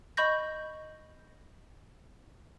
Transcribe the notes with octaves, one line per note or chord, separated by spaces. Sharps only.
D#5 B5 C#6 G6 A#6